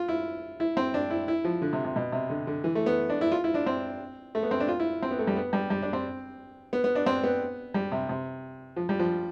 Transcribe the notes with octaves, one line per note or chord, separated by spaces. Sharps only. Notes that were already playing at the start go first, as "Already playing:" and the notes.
Already playing: F4
E4
E4
C4
D4
E4
E4
F3
D3
C3
C3
B2
C3
D3
D3
E3
A3
B3
D4
E4
F4
E4
D4
C4
A3
B3
C4
D4
F4
E4
C4
B3
A3
G3
B3
G3
G3
D4
C4
B3
B3
D4
C4
B3
G3
C3
C3
F3
G3
F3